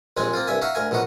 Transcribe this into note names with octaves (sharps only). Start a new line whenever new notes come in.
A#1 D#2 G#3 C4 G#5
A#3 C4 F4
C2 G2 E5 G#5
D#4 F#4 E5 F5
D2 A#4 G#5
A#1 B2 D#3 D#4 F#4